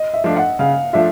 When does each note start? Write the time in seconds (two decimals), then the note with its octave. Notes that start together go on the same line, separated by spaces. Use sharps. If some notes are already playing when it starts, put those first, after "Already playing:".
Already playing: D#5
0.14 E5
0.24 F3 A3 D4 F4
0.36 F#5
0.59 C#3 F5
0.93 F3 A3 D4 F4 E5